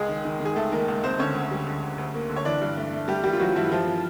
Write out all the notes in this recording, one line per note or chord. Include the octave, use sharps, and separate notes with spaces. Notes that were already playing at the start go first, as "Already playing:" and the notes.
Already playing: C#2 G#3 G#4
D#3
D#3
D#3
G#4
C#2 A3 A4
D#3 A#3 A#4
C#2
C#2 C4 C5
D3 C#4 C#5
D2
G3
D3
D2
D2
A#3
D3
C#5
E3 D4 D5
G2
A3
A3
G3 A3 G4
E3 G3 G4
F4
E3 F#3 F#4
G2 E3 E4
E3 F3 F4
E3